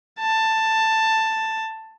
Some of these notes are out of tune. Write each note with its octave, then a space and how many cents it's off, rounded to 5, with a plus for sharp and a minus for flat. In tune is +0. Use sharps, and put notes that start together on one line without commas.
A5 +10